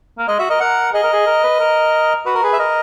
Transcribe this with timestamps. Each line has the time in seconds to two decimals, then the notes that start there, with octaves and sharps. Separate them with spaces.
0.18 A#3
0.28 G#3 D#5
0.39 F#4 E5
0.50 A#4 D#5
0.60 A#4 F#5
0.93 G#4 D#5
1.04 A#4
1.13 G#4
1.26 A#4
1.44 B4
1.59 A#4
2.26 F#4 B4
2.35 A#4
2.43 G#4 B4
2.53 E5
2.59 A#4 D#5